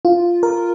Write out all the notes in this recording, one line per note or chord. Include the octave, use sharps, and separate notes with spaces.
F4
A#4